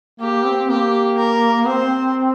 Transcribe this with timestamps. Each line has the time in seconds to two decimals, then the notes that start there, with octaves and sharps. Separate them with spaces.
0.20 A#3 G4
0.46 C4
0.69 A#3 G4
1.18 A#4
1.67 C4 C5